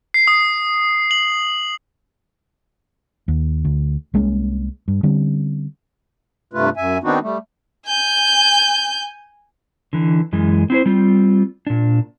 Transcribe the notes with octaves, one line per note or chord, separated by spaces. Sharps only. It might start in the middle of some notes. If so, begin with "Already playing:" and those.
C7
D#6
F#7
D#2
D2
C2 G#3 A#3 C#4
G2
D3 G3 C4 C#4
G2 C3 A3 F4 B4
F#2 E5 G#5
D#3 B3 C4 D4 D#4 F#4
G3 A3
G#5 G6
D3 E3
F#2 E3 G#3
C4 E4 C5
G3 C4 F4
A#2 D4